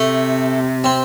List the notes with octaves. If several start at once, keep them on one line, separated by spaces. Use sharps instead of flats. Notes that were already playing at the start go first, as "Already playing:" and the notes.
Already playing: C3 A3
C4